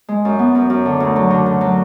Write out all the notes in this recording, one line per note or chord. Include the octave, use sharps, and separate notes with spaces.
G#3
F#2
B3
F#2
F#2
D3
D2
F#3
D3
D3
F#3